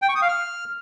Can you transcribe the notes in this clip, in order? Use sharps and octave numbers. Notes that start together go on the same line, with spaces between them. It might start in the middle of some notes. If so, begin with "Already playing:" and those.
G5
C#6
D#6
F5
F6